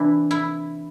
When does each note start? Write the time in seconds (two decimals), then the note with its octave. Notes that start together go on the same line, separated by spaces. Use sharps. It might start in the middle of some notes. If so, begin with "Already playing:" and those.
Already playing: C3 E3 D4 E4
0.31 E4